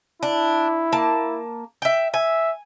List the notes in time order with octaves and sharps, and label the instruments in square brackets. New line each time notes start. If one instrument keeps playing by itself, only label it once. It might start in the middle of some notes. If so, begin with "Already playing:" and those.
[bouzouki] D4 [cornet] E4
[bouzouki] A#3 A5
E5 G5
[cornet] E5 [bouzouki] G#5